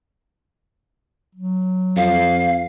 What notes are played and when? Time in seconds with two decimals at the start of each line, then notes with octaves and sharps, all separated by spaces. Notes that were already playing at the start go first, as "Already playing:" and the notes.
1.35 F#3
1.97 F2 F5